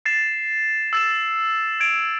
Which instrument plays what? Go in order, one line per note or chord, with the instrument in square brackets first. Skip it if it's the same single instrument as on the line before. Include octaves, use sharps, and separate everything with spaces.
[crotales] A6 C7 E7
E6 A6 E7
G#6 D7 F7